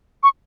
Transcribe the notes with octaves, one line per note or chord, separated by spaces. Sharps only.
C#6